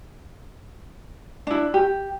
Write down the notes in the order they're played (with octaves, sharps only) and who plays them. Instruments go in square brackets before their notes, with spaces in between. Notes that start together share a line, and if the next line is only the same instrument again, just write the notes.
[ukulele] D4 E4
G4